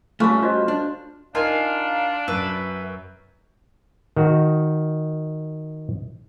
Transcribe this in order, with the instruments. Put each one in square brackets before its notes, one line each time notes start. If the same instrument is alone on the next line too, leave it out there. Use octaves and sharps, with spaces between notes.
[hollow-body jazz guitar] G3 A3 [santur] C#4 F4 B4
[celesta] F4 F#4 D#5 [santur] C5
[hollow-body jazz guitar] D4
[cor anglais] D4 [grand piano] D#4 [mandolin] F4 A#4 G#5 [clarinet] F5
[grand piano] F#2 [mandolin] B4 E5
[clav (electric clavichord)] D#3 F#4